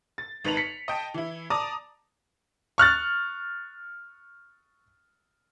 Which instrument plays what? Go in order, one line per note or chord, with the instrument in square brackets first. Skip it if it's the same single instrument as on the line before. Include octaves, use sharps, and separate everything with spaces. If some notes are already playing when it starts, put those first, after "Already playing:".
[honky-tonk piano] A6
G#1 D#4 B4 A5 F7 F#7
B6 C#7
D#5 G5 A5
E3 E4
D5 A5 A#5 D6 D#6
[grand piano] C#6 F6 F#6 A6